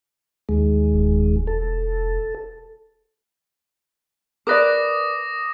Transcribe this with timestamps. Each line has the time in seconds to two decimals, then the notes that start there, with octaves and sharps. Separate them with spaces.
0.49 D#2 G#3
0.93 E1
1.47 A4
4.47 A#4 B4 D5 D6 D#6 A#6